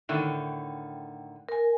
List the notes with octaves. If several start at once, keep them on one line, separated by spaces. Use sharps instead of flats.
A2 D3 D#3
A#4 G#5